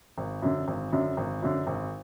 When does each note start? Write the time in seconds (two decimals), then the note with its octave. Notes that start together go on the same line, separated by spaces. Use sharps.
0.18 G#1
0.42 F#2 D3
0.68 G#1
0.92 F#2 D3
1.17 G#1
1.42 F#2 D3
1.67 G#1